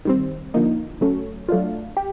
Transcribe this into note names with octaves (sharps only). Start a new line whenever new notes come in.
D#3 G3 C4
D3 F3 A#3 D#4
F#3 A3 C#4
F#3 A3 D4 F4
G4